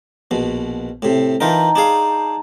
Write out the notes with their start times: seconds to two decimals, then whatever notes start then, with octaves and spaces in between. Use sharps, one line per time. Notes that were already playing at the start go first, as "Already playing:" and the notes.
0.31 A#1 B2
1.02 A2 C3
1.41 E3 D#4 F4 A#4 G5 A5
1.76 D4 G#4 F5